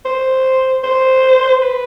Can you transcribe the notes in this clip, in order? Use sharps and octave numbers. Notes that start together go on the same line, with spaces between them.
C5
C5
B4